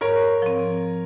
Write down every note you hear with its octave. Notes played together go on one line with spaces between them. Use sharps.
G#2 A#4 C#5
F3 C4